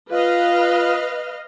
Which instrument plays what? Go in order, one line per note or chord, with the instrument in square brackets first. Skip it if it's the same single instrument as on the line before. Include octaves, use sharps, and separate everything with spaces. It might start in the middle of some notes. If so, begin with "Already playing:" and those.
[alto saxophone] F4 [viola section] B4 D#5 F5